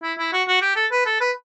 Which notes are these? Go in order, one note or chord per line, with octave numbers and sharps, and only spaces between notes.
E4
E4
F#4
F#4
G4
A4
B4
A4
B4